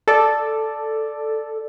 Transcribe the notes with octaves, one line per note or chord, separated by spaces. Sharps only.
A4 D5